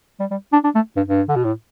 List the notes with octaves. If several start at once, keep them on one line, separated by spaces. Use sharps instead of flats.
G3
G3
D4
D4
A3
G2
G2
D3
B2
A2